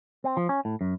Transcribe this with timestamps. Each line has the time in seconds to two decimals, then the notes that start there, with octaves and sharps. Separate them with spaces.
0.24 C4
0.37 F3
0.49 C#4
0.65 A2
0.81 F#2